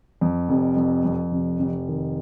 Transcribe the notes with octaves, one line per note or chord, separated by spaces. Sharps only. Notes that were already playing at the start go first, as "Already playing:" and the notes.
F2
F1
F2
F2
F1
F1
D#3